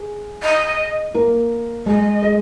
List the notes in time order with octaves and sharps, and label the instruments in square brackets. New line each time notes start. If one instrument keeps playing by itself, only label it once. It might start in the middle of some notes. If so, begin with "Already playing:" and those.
Already playing: [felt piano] G#4
[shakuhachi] D#5
[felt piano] A#3 A#4
[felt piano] G#3 G#4 [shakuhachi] D#5
[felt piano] G#3 G#4